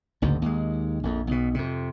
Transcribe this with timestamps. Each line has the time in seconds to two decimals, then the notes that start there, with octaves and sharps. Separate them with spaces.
0.22 F#1 D2 G#2
0.42 D#2 G#3
1.03 A#1 F2
1.27 B1 B2
1.54 F2 C3